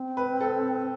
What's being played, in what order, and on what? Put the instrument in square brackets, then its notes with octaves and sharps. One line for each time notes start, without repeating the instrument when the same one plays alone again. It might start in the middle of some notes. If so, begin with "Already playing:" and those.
Already playing: [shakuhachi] C4
[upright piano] B4
A4